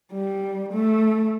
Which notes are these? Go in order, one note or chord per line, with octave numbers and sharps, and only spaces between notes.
G3
A3